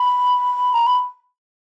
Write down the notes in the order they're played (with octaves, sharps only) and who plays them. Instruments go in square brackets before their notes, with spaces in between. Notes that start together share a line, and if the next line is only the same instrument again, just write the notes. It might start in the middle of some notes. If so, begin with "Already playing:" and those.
Already playing: [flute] B5
A#5
B5